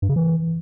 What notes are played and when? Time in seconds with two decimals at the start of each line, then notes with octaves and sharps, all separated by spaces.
0.02 G2
0.09 C#3
0.16 E3